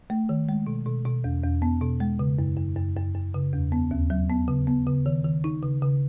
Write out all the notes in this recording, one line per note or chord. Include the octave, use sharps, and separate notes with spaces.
A3
D#3
G#3
B2
B2
B2
E2
E2
B3
B2
G#3
C#3
F#2
F#2
F#2
F#2
F#2
C#3
E2
B3
D#2
F#3
B3
C#3
B3
C#3
D#3
D#3
D#4
C#3
C#3